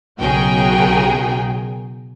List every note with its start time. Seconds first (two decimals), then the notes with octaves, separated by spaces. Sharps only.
0.19 B1 C#3 F#4 G#4 A#4 G5